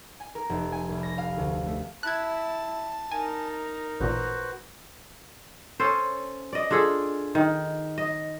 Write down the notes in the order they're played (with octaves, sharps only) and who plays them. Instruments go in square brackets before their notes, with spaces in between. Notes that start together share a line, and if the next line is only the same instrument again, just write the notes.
[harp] G#5
A#4
F1
G#5
C2
A#6
F5
D2
A3
[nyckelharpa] E4 [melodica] A5 [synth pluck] F#6 G#6
[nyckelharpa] D#4 A#4 [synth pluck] G#5
[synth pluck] A1 A#2 [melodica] F#4 B4 C5
[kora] C#4 A4 C5
D5 D#5
D4 F4 G#4 A4
D#3
D#5